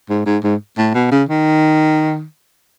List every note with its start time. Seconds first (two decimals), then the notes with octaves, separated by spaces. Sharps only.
0.09 G#2
0.26 G#2
0.43 G#2
0.77 A2
0.94 B2
1.11 C#3
1.28 D#3